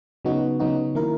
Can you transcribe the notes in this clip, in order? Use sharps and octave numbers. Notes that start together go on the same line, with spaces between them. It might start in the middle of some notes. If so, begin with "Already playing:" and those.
C#3 F#3 B3 D#4 F#4
C#3 F#3 B3 D#4 F#4
D#3 A#3 E4 A#4